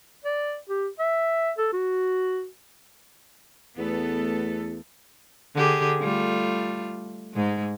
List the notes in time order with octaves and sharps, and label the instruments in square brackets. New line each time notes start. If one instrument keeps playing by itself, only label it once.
[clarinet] D5
G4
E5
A4
F#4
[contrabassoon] E2 [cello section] A3 B3 A4
[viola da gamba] D3 G4 G#4
G3 A3 F4
G#2 G#3